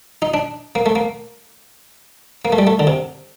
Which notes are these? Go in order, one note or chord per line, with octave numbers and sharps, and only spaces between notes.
D#4
D4
A#3
A3
A#3
A#3
A3
G3
A3
D3
C3